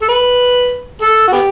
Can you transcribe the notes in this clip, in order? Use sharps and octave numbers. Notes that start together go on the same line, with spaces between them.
A4
B4
A4
F#4
B3 G4